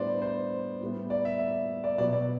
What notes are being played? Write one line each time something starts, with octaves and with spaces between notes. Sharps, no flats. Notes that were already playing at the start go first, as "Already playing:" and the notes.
Already playing: A2 G3 B3 D4 C5 D5
C5
A2 G3 B3
D5
E5
E5
D5
B2 F#3 B3 D5
D5